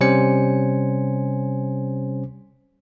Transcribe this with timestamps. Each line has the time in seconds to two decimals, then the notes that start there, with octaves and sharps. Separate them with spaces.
0.01 C3 G3 C#4 C5 G#5 C#7